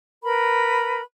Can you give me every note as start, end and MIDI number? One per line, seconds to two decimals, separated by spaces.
0.24 1.02 70
0.24 1.02 71
0.24 1.02 83